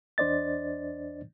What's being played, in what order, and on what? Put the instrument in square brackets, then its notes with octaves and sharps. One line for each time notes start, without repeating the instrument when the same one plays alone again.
[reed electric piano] E2 D4 C5 D5 D#5 A6